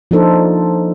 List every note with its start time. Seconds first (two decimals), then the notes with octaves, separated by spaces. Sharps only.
0.11 F3 A#3 D4 D#4 A4 C5